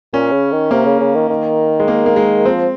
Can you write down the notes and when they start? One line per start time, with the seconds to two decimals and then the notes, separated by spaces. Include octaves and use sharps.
0.13 A#2 C#4
0.32 C#3
0.52 D#3
0.71 C3 A#3
0.86 C#3
1.00 C#3
1.15 D#3
1.29 D#3
1.80 G#3
1.88 A#3
2.06 A#3
2.16 G#3
2.45 F3 C4